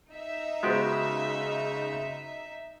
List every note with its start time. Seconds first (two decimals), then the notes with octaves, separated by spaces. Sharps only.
0.11 D#4 E5
0.63 C#3 G#3 B3 F#4 G4 B4 C5